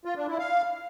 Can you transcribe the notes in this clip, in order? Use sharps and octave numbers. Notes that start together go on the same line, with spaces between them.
F4
D4
E4
F5